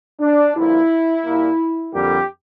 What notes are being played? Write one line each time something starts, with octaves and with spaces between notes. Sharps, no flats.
D4
G2 D3 F3 A#3 E4
A#2 G3 A#3
F2 D3 G3 A#3 G4